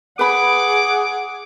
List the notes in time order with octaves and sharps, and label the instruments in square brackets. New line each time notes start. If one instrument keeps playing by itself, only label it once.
[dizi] G#4 [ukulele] B4 B5 [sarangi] F#5 [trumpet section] D6